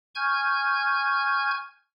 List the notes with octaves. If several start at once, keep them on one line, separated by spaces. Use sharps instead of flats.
G#5 C#6 F6 G6 G#6